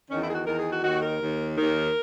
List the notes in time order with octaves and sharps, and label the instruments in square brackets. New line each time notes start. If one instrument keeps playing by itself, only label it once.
[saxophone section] E2 D#3 C#4
E4
G#4
F#4
E2 D#3 A#4
G#4
F#4
D#2 D#3 F#4
A#4
D#2 D#3
D#2 D#3 A#4